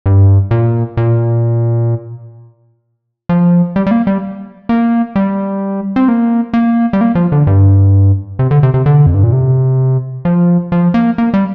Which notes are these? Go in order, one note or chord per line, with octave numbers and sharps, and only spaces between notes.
G2
A#2
A#2
F3
G3
G3
A#3
G3
A#3
G3
C4
A#3
A#3
G3
A#3
F3
D3
G2
C3
D3
C3
C3
D3
F2
G2
A#2
C3
F3
F3
A#3
A#3
G3